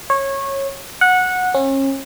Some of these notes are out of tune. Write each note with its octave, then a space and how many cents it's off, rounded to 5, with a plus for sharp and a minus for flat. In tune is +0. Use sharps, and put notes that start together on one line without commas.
C#5 -20
F#5 -15
C#4 -35